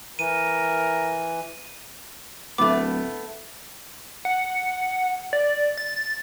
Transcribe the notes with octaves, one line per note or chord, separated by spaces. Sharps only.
E3 A#4 D#7
D1 A3 B3 D6
F#5
D5
A6